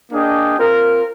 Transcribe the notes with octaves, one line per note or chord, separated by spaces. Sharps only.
A#3 D4 G#4 D#5 G5
C4 F4 A#4